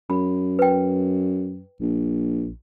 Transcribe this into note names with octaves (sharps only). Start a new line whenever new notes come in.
F#2 B5
B4 G5
A#1